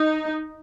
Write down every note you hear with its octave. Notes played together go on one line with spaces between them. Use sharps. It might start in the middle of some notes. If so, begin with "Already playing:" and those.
Already playing: D#4